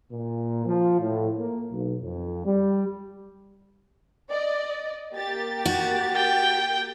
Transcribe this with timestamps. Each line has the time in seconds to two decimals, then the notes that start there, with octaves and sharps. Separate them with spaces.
0.12 A#2
0.66 F3
1.01 A2
1.37 A#3
1.71 B1
2.01 F2
2.46 G3
4.30 D5 D#5
5.15 A#3 G4 A6
5.65 F#4
6.16 G5